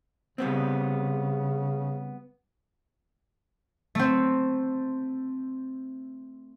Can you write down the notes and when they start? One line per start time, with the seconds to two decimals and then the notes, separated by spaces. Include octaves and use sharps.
0.38 C#3 G3 B3 C4
3.95 A3 C4